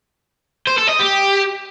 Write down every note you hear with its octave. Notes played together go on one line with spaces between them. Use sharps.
C5
A4
D#5
G4